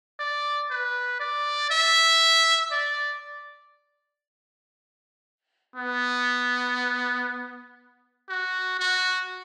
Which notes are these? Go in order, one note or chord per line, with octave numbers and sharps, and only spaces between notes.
D5
B4
D5
E5
D5
B3
F#4
F#4